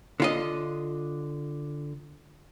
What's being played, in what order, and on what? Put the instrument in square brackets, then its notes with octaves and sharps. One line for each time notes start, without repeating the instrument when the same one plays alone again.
[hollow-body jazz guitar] D3 F4 D#5